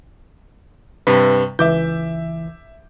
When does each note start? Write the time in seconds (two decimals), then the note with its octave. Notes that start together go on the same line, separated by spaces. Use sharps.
1.07 G2 C3 B4
1.59 C#2 E3 E5 D6 G6